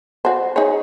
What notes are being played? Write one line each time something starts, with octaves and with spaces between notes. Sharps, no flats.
F#4 C5
D#4 G#4 C#5